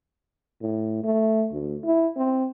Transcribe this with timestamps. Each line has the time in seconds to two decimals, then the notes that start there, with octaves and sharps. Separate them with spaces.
0.61 A2
1.04 A3
1.52 D2
1.84 E4
2.17 C4